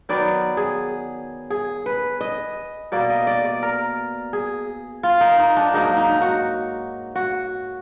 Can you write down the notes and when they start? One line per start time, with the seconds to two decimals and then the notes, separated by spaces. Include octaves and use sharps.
0.09 D#3 F#3 B3 D5
0.57 G#4
1.50 G#4
1.86 B4
2.21 D#5
2.92 B2 A#3 D5
3.10 D#5
3.27 D5
3.45 D5
3.63 A#4
4.33 G#4
5.03 F4
5.21 D#4
5.39 D#4
5.57 D4
5.74 G#2 F#3 A#3 D#4
5.98 D#4
6.22 F#4
7.15 F#4